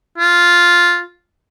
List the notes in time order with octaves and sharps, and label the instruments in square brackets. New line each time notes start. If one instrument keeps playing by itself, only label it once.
[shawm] F4